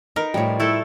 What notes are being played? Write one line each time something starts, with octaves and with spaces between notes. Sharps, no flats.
D#4 A#4 B4
A2 F3 G3 C#5
A3 E4 A4